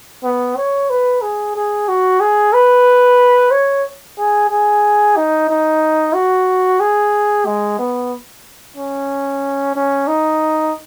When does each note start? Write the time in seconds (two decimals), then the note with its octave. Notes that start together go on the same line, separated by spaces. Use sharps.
0.24 B3
0.56 C#5
0.90 B4
1.22 G#4
1.56 G#4
1.88 F#4
2.21 G#4
2.54 B4
3.51 C#5
4.17 G#4
4.50 G#4
5.17 D#4
5.49 D#4
6.14 F#4
6.80 G#4
7.46 G#3
7.79 B3
8.76 C#4
9.75 C#4
10.08 D#4